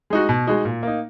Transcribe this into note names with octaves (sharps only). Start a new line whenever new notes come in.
G#3 D#4 F#4
B2
G#3 D#4 F#4
A#2
A#3 D#4